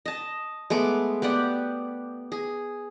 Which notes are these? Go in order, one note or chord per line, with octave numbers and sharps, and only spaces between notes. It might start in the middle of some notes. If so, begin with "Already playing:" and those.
D#5 A5
G#3 A3 B3 D6
B3 G4 D5 F#5
G#4